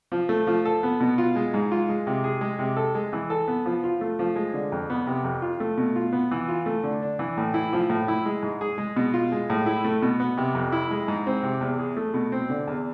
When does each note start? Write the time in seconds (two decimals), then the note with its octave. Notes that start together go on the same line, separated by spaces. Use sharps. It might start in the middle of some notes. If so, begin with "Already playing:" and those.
0.12 F3
0.29 A3
0.47 F3
0.65 A4
0.83 B3
1.00 B2
1.18 F4
1.36 G#3
1.54 G#2
1.72 F4
1.89 G#3
2.07 C3
2.24 G#4
2.41 G#3
2.59 C3
2.76 A4
2.95 G#3
3.13 E3
3.30 A4
3.48 B3
3.65 F3
3.84 F4
4.01 A3
4.19 F3
4.36 G#3
4.54 D3
4.72 F2
4.90 B3
5.07 C3
5.24 F2
5.42 F4
5.60 A3
5.78 B2
5.96 F4
6.13 B3
6.31 E3
6.49 F4
6.66 A3
6.83 D3
7.02 D4
7.19 E3
7.38 A2
7.54 E4
7.73 F3
7.90 A2
8.08 E4
8.26 G#3
8.43 G#2
8.61 G#4
8.78 G#3
8.96 B2
9.14 F4
9.32 G#3
9.50 A2
9.66 E4
9.84 A3
10.02 B2
10.20 B3
10.38 C3
10.55 F2
10.72 E4
10.91 G#3
11.08 G#2
11.27 C4
11.43 C3
11.61 E2
11.79 G#4
11.97 A3
12.14 B2
12.32 C4
12.50 D3
12.67 E2